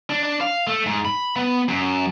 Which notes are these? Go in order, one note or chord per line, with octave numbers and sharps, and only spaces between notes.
D4
D4
F5
A3
G#2
B5
B3
F#2